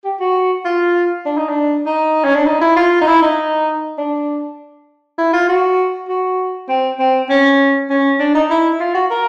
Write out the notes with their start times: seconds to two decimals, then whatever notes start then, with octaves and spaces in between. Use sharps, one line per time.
0.05 G4
0.20 F#4
0.65 F4
1.26 D4
1.37 D#4
1.49 D4
1.86 D#4
2.24 C#4
2.35 D4
2.47 D#4
2.61 E4
2.76 F4
3.01 D#4
3.07 E4
3.22 D#4
3.98 D4
5.18 E4
5.33 F4
5.49 F#4
6.09 F#4
6.69 C4
6.99 C4
7.30 C#4
7.90 C#4
8.20 D4
8.35 D#4
8.50 E4
8.80 F4
8.95 F#4
9.11 A#4